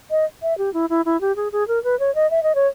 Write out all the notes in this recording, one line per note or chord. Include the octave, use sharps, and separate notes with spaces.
D#5
E5
G4
E4
E4
E4
G4
G#4
G#4
A#4
B4
C#5
D#5
E5
D#5
C#5